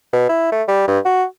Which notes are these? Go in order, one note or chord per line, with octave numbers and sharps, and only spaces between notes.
B2
E4
A3
G3
G2
F#4